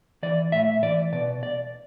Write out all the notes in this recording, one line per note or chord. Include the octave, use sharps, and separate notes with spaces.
E3 D5
A2 E5
E3 D5
B2 D5
D5